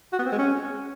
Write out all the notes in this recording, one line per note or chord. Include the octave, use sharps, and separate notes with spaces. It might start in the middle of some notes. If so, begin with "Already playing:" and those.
F#4
B3
C4
G#3
C#4